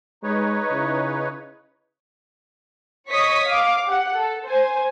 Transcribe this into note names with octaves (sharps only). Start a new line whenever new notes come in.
G#3 D#4 B4 C#5
C#3 E4
C#5 D#5 C#6 D#6 B6
F5 D6
G4 F#5
A4
C5 G#5